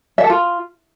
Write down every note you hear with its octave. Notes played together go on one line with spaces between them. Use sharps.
E5
A4
F4